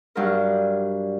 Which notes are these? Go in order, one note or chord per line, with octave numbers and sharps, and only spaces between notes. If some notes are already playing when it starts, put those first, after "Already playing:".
G2 F#3 D4 A#4